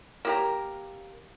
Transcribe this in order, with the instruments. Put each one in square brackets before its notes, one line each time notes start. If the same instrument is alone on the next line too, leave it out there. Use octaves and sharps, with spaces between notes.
[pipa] A#3 G4 A#4